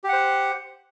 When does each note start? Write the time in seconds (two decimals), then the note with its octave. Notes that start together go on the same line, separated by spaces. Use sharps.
0.04 G4
0.08 F#5
0.13 C5